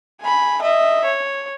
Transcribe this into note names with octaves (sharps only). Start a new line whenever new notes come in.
G#5 B5
D#5 E5
C#5